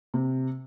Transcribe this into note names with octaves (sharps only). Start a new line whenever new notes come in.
C3